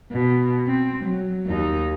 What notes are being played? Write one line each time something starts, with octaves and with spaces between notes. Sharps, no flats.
B2
C4
F#3
D#2 D#4